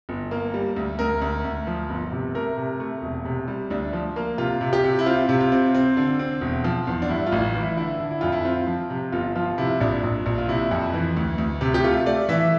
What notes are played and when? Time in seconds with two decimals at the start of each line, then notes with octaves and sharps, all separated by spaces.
0.09 G1
0.31 A#3
0.54 G3
0.76 D2
0.99 D2 A#4
1.22 D2
1.44 D2
1.67 F3
1.90 G1
2.12 C3
2.35 A3 A#4
2.58 C3
2.80 A3
3.02 E1
3.25 C3
3.48 G3
3.70 D2 D4
3.93 F3
4.16 A#3
4.38 C3 F4
4.61 C3
4.73 G4
4.84 C3
4.99 E4
5.06 C4 F4
5.29 C3
5.40 F4
5.52 C4
5.74 C4
5.97 D3
6.19 C4
6.41 E1
6.64 F3
6.87 E2
7.02 D4
7.09 G2 E4
7.26 F4
7.32 A1
7.55 E3
7.60 E4
7.77 D3 E4
8.00 D3
8.11 E4
8.21 F2 F4
8.32 E4
8.45 C4 F4
8.67 F3
8.90 C3
9.12 G1 F4
9.36 F3 F4
9.58 C3 E4
9.80 A#1 D4
10.04 A#1
10.26 A#1
10.38 F4
10.48 C3 E4
10.71 F2
10.94 E3
11.17 D2
11.38 D2
11.61 C3
11.74 G4
11.84 A3 F4
12.06 A3 D5
12.29 E3 E5